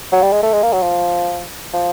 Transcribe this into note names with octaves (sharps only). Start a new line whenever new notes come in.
F#3
G3
G#3
A3
G#3
A#3
F#3
F3
F3